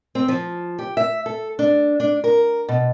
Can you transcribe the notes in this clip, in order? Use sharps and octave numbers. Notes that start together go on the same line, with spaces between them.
C4
F3
G4
E5
A4
D4
D4
A#4
B2